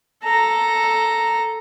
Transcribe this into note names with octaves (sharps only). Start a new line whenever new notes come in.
A4 A#5